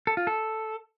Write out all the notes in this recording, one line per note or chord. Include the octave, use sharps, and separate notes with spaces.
A4
F4
A4